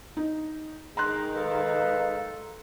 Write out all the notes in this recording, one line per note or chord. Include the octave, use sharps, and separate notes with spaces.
D#4
D#3 G#3 A#5 C6 F#6
D#4 A4 B4 F5